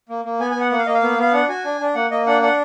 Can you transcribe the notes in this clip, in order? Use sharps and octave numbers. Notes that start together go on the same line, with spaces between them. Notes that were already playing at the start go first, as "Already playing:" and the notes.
A#3
A#3
B3 G#5
G#5
B3
F#5
A#3 F#5
F5
A#3 D#5
F5
B3
B3 F5
D4 F#5
F#4 G#5
D4
D4
A#3 F#5
A#3 D#5
D4 F#5
D4 F#5